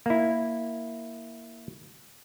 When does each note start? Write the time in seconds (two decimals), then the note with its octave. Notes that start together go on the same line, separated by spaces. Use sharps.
0.06 A#3 E4